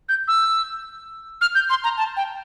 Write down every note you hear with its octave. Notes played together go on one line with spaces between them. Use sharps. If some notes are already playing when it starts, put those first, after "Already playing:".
G6
E6
F6
G6
C6
A#5
A5
G5